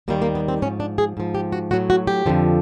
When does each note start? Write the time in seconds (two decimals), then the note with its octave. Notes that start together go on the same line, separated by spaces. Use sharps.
0.08 D#2 D#3 G3 A#3
0.22 A#3
0.35 B3
0.48 C4
0.62 G#2 C#4
0.65 F3
0.80 D4
0.98 G#4
1.17 G#2 F3
1.35 G4
1.52 F#4
1.71 A2 F#3 F#4
1.90 F#4
2.07 G4
2.26 F2 D3 F3